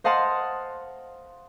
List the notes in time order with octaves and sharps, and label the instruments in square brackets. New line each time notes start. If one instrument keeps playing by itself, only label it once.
[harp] C5 D#5 F5 F#5 A5 C6